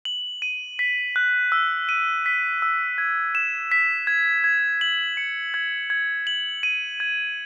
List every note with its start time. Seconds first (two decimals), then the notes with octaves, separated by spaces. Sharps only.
0.05 F#7
0.42 D#7
0.79 B6
1.16 F#6
1.52 E6
1.89 D#7
2.26 B6
2.62 E6
2.98 G#6
3.35 E7
3.72 B6
4.07 G#6
4.44 G#6
4.81 F#7
5.17 C#7
5.54 G#6
5.90 G#6
6.27 F#7
6.63 D#7
7.00 G#6